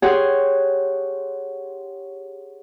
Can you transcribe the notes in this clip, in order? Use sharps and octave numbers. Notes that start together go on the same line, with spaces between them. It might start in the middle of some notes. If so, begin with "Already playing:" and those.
G4 G#4 C#5 F#5 G#5 C6